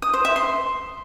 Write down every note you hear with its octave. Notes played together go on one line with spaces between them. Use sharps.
D#6
C5
E5
C6